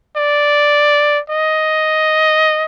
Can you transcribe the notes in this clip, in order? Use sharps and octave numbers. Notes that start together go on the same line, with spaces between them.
D5
D#5